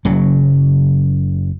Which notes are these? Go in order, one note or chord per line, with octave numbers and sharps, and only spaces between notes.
F#1 C#3 F#3